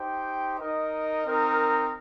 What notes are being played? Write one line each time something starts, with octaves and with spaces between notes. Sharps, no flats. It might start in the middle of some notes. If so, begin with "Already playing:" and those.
Already playing: D#4 G4 C5 G5
D#4 A#4 D#5
C4 D#4 A#4